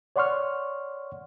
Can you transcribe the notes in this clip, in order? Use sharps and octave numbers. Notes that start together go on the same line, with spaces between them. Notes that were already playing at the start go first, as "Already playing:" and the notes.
C#5 D5 F#5 C6 C#6 F6